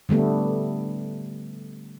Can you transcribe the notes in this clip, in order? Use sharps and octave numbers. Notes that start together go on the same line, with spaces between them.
D3 G3 A3 B3